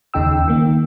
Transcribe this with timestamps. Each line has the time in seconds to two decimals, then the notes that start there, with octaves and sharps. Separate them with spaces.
0.14 D#2 C#3 D#4 G5 E6
0.48 D#3 A#3